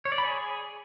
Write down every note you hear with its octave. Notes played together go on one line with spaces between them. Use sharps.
C#5
D5
B5
G#4